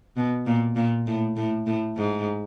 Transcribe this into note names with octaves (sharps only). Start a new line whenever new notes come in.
B2
A#2
A#2
A2
A2
A2
G#2